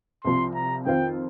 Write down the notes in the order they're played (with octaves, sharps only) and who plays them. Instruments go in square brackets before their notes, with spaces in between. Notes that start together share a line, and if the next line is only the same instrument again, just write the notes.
[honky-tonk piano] C2 C3 F3 [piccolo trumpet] C6
[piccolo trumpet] A#5
[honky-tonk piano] F2 D#3 C4 F4 [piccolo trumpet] G5